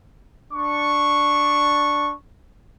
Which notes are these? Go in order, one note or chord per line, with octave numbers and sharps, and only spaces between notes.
D4 C#6